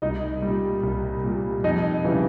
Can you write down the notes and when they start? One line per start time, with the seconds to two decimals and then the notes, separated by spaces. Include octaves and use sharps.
0.02 C2 D#4 D#5
0.42 A#2 G3
0.83 C2
1.24 A#2 G3
1.64 F2 D#4 D#5
2.04 C#3 E3 G3